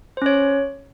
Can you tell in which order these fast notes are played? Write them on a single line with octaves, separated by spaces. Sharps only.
C5 C#4 C#5